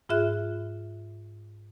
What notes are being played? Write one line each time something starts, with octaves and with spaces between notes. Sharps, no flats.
G#2 F4 G#4 E5 F#6